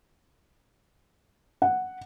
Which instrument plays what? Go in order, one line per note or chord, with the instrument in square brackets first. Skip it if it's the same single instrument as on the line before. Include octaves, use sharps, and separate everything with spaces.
[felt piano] F#5